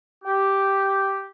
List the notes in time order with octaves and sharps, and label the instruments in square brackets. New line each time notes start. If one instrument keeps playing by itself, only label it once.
[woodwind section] G4